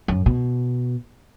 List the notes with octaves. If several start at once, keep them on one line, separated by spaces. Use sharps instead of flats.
F#2
B2